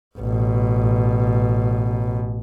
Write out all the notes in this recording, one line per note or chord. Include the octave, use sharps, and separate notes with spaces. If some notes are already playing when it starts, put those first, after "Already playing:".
A1 B2